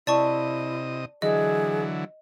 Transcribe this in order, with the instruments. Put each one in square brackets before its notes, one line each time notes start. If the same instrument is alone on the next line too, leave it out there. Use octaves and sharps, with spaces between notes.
[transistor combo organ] C3 D#5 [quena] E4 [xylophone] D5 A5 C#6
[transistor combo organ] D3 E3 F#3 [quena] G#4 [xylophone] D#5